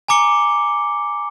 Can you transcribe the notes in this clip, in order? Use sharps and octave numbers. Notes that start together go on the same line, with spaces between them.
G#5 A#5 D6 C#7 G7